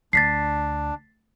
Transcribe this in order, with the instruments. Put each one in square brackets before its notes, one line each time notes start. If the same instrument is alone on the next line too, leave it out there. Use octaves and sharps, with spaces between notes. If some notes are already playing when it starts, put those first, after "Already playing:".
[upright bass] D2 [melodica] D4 [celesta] A6 B6 C7